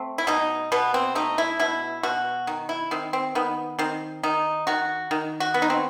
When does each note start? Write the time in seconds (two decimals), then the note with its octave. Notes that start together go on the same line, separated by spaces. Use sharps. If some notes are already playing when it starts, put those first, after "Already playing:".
Already playing: A3 C4
0.18 E4
0.27 B2 D#4
0.72 B2 B3
0.94 C4
1.15 A3 D#4
1.38 E4
1.59 B2 E4
2.03 B2 F#4
2.47 D#3
2.69 E4
2.91 D#3 C4
3.13 C4
3.35 D#3 B3
3.79 D#3 C4
4.23 D#3 D#4
4.67 D#3 F#4
5.11 D#3
5.40 F#4
5.54 B3
5.62 D#4
5.70 C4